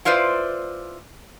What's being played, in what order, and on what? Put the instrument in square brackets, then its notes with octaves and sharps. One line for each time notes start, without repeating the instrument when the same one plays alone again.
[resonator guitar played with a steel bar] E4 F4 B4 C5 D5